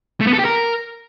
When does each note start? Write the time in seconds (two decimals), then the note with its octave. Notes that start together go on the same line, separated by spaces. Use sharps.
0.21 A3
0.27 B3
0.33 A4
0.39 G4
0.45 A#4